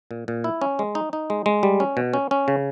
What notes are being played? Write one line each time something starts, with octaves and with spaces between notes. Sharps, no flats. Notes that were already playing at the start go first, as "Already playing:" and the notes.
A#2
A#2
E4
C#4
G#3
D#4
D#4
G#3
G#3
G3
C#4
B2
C#4
C#4
C#3